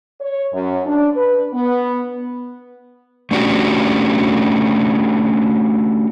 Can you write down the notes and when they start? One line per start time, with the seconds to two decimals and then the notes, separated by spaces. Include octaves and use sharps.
0.20 C#5
0.53 F#2
0.86 D4
1.16 B4
1.54 B3
3.31 A3 C#4 D4 F#4 G4